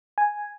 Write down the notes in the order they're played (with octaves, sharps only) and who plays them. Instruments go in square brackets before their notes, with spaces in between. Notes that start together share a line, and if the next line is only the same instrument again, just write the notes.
[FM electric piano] G#5